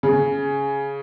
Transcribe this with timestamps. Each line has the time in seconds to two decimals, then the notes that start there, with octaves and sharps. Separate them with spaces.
0.03 C#3